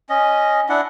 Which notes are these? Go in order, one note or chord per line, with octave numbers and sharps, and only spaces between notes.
C#4 D#5
D4 E4 F#5